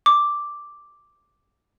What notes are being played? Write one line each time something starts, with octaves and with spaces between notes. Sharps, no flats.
D6